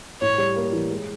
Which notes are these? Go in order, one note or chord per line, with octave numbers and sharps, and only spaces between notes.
A2 C#5
G3
A#3
E3
G#3